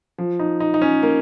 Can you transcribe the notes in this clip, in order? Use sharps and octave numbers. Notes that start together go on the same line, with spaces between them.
F3
D#4
D#4
D#4
C#4
A#3